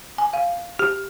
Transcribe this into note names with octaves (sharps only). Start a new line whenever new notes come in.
G#5
F5
G4